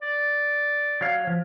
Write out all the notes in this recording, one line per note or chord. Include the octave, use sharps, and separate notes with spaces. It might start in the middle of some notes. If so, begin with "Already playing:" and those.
D5
F#3 C#5 F5
F3